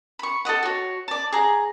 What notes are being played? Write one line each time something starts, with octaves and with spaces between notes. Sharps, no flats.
B5 C#6
A4 D5 D#5 F#5
F#4 C#5
D5 A5
G#4 A#5